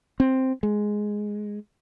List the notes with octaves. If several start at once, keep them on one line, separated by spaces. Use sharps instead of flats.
C4
G#3